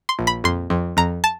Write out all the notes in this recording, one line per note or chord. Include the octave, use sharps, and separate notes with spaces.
C6
A#1
B5
F2 C6
F2
F2 A#5
A5